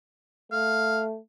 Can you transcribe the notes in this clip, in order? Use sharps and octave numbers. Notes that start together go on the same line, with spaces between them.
A3 F5